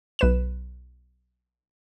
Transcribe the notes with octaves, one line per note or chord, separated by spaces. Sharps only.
B1 B4 E7